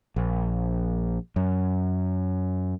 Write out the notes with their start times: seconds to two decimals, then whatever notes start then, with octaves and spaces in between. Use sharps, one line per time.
0.16 A#1
1.36 F#2